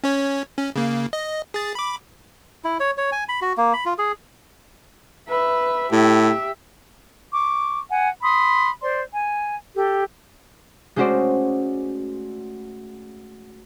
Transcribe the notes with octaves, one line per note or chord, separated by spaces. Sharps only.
C#4 C#5
C#4
C#3 A#3
D#5
G#4 A6
B5 D6
E4
C#5
C#5
G#5
B5
F#4
A#3
B5
F4
G#4
B4 E5
A2 G4 E5
C#6 D6
F#5 G#5
B5 C6 D#6
C5 D5 C6
G#5
G4 A4
G#3 A3 C#4 F#4 C5 D5